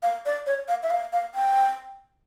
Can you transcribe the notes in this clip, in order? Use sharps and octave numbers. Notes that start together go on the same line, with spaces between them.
F5
D5
C#5
F5
E5
F5
F5
G5